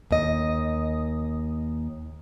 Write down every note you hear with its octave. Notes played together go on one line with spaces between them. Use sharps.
D#2 D#5